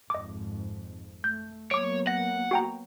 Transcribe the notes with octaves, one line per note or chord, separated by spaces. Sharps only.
G#1 F2 G#2 D#5 D6
A3 G6
F#3 A#3 B3 C#5 D6 D7
F#5 A#6
F#4 G5 A#5